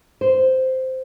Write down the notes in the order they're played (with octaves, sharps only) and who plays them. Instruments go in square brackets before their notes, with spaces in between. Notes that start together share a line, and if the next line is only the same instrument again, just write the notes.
[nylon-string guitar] C5